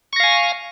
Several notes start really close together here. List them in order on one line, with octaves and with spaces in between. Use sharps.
C#6 A#6 F5 G#5